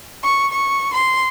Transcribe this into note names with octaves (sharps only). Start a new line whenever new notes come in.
C#6
C#6
C6